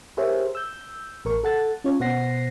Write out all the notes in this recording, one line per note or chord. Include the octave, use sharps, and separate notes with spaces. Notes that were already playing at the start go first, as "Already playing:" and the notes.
G4 G#4 A#4 C5 C#5 E5
E6 G6
A1 A#4 C#6
A4 F#5 A6
C#4 F4 C#5
B2 C5 F#5 A#6 C7